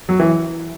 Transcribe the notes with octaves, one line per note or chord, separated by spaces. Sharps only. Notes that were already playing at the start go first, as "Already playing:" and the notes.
F#3
E3